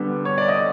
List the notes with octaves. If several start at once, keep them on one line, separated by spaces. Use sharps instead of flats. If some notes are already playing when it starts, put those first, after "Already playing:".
Already playing: D3 G3 B3
C#5
D5
D#5